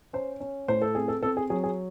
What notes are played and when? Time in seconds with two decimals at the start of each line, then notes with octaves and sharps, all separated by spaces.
0.13 C#4 C5
0.40 C#4
0.68 A2 C5
0.82 A4
0.95 C4 G#4
1.08 A4
1.22 C4 A4
1.37 G#4
1.50 F#3 G#4
1.64 G#4